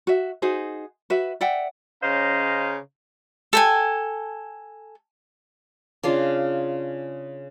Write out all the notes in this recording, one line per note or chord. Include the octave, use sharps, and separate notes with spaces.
F#4 E5
D#4 F#4 G#4 C5
F#4 B4 E5
D5 E5 F#5 G5
C#3 C#4 C5 D#5 F5 A#5
A4 G5 G#5
C#3 D4 F4